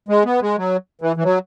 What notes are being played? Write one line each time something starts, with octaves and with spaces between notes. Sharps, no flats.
G#3
B3
G#3
F#3
E3
E3
F#3